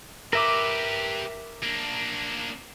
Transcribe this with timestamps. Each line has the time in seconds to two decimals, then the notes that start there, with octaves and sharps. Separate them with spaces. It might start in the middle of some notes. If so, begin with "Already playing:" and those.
0.33 G4 A#4 B4 E5 D6
1.63 A#3 D4